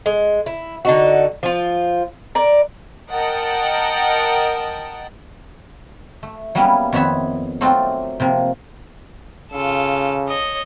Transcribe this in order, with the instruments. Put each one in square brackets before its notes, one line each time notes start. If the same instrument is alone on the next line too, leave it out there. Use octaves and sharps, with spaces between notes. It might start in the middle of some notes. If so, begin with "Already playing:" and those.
[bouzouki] G#3
E4
D3 D#4 F#4
F3 F4
A#4 D5
[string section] A#4 D#5 F#5 G5 A5
[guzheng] A3
F#3 G3 A#3 B3 C#4 E4
F2 D#3 B3 C#5 E5
F#3 A3 C4 D4 D#4 F4
C3 F3 A#3
[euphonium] C#3 [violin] F4 A4
[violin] C#5 D#5